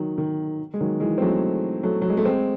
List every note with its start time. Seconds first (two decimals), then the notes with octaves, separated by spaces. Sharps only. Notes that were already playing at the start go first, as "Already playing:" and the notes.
Already playing: D#3 F#3
0.18 D#3
0.74 G#3
0.80 D#3 F#3
1.00 E3 G#3
1.18 C4
1.21 F#3 A3
1.83 F#3 A3
2.02 F#3
2.09 G#3
2.17 A3
2.25 G#3 C4